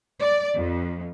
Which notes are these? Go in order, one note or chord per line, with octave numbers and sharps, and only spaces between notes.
D5
F2